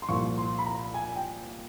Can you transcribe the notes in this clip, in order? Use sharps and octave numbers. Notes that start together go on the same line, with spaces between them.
C6
C2 A#2 F3 C#6
C6
B5
A#5
G#5
G5